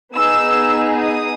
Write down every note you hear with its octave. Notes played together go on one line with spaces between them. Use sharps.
B3 D#4 G#4 E6
D#6